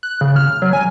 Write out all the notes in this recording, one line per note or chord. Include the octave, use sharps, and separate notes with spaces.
F#6
C#3
F6
F#3
G#5